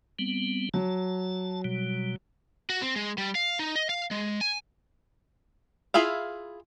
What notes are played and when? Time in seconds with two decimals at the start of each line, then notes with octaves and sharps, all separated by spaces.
0.19 G3 B3 C4
0.74 F#3 A5
1.64 B2 G3
2.70 F#4
2.82 C4
2.96 G#3
3.18 G3
3.35 F5
3.59 D#4
3.76 D#5
3.89 F5
4.11 G#3
4.41 G#5
5.94 E4 F4 G#4 E5 F5